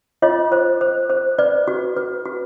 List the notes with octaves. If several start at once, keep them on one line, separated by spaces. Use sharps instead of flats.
F4 C#5 D#5
C5
C5
C5
B4 D5
F#4
B4
F#4